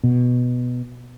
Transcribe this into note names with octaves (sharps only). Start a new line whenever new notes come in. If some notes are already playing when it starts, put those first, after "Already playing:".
B2